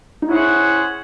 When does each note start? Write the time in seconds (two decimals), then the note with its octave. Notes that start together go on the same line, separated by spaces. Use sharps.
0.22 D#4
0.29 C#4 E4 G#4 C5 F#5